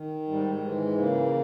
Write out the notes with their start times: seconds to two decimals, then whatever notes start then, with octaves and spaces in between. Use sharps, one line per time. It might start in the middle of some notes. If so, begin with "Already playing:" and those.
Already playing: D#3
0.28 G#2 G3
0.56 G3
0.63 E3 G#3
0.97 C#3 A#3